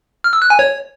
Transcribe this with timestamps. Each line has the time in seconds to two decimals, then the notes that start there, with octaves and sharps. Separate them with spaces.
0.24 F6
0.33 E6
0.42 F#6
0.50 G#5
0.59 C#5